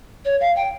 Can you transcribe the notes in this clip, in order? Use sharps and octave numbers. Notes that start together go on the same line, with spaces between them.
C#5
F5
G5